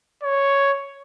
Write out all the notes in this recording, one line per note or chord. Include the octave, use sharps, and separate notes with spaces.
C#5